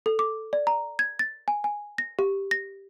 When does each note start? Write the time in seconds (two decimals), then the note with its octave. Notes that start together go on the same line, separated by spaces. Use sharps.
0.06 A4
0.19 D6
0.53 D5
0.67 A#5
0.99 G#6
1.19 A6
1.48 G#5
1.64 G#5
1.98 A#6
2.19 G4
2.51 A#6